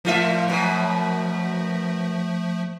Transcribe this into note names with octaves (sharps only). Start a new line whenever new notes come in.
A2 F3 A3 F4 E5
F#2 B2